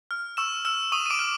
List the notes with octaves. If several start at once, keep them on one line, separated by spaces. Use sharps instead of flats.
F6
C#6 E6 E7
E6 F6 E7
C#6 D#6 D#7
D#7
D6 D7
F6